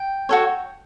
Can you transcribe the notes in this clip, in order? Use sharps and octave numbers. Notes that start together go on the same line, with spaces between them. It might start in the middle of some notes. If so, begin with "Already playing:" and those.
Already playing: G5
F#4 A4 C#5